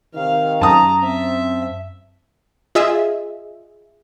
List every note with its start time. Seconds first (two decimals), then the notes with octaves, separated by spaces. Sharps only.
0.15 C3 D#3 F5
0.61 F#2 A5 A#5 D#6
1.03 C4 E5
2.75 F4 G#4 D#5 E5